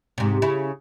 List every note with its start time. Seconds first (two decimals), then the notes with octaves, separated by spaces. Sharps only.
0.18 G#2 C3
0.42 C#3 E4